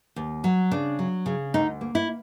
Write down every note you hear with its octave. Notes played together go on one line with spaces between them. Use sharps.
D#2
F#3
C#3 D4
F#3
C#3
D2 D#4
A#3
E4